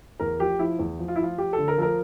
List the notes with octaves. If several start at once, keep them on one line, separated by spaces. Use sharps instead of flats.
E2 A#4
F3 G4
F3 E4
E2
F3
F4
E4
F3 F4
F3 G4
D3 A4
A#4
F3 A4 A#4